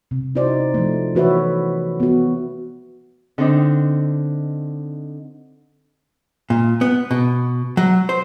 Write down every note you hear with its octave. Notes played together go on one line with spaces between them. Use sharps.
C3
D#4 E4 F#4 C5 D5
F3 A3
E3 F#4 B4 C#5 E5
B3 F#4
D3 C4 D4 D#4
A#2
B3
B2
F#3
C5